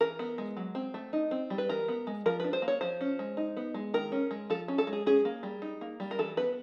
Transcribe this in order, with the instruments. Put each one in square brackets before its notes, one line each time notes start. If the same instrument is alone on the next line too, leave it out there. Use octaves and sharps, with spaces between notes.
[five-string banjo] E3 A#4
B3
G#3
F#3
C4
A3
D#4
C4
G3
B4
E3 A#4
B3
G#3
F3 A#4
D4 B4
C5
A#3
C#5
F3 C5
C#4
G#3
D#4
B3
G#3
D#3 A#4
C#4
G#3
F3 A4
C#4
A4
G#3
G#4
C#4 G#4
A#3
G3
D#4
A#3
G3
A#4
E3 A4
B3 B4